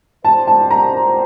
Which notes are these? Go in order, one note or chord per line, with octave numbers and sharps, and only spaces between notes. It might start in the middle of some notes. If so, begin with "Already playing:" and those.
G3 C4 G4 C5 A5
A5
A#5